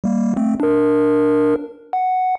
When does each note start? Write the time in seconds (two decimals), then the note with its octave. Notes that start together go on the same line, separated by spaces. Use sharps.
0.04 G3 A#3
0.36 A3 C4
0.60 D4 A#4
1.93 F#5